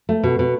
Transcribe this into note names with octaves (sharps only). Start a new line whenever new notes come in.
A3
B2
B2